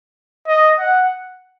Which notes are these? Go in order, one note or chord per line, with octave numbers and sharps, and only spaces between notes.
D#5
F#5